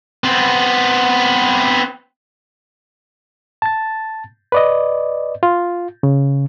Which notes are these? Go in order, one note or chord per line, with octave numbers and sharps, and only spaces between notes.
B3 C4
A5 A6
B4 D5 D#5
F4
C#3